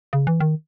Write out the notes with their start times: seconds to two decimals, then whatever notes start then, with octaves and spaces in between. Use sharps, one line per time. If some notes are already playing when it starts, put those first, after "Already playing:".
0.13 C#3
0.27 E3
0.40 D#3